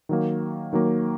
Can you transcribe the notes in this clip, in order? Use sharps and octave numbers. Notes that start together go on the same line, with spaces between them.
D#3 F#3 A#3
D#3 F#3 A#3